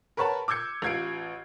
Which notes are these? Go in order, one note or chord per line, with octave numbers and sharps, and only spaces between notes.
A#4 B4 C#5 F#5 A5 B5
D6 E6 G6 G#6 C#7
A1 F4 G#6 C7 D7